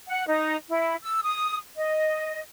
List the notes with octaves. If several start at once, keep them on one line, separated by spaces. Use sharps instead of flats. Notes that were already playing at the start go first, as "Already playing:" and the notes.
F#5
D#4
E4
E6
D#6
D#5